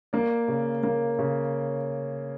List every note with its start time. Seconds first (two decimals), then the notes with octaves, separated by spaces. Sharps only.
0.13 A#3 D5
0.48 C#3
0.83 A#3
1.19 C#3